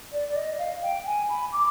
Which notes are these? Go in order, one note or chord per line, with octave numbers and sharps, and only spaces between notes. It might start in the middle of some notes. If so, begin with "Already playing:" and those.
D5
D5
D#5
F5
G5
G#5
B5
D6